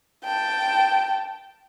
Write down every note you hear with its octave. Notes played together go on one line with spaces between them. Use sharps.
G5 A5